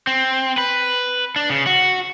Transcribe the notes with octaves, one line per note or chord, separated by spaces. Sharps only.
C4
B4
D4
C#3
F#4